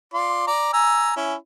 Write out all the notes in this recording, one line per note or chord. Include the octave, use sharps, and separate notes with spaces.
F4 D5 C6
D5 A#5
G#5 A#5 E6
C#4 E4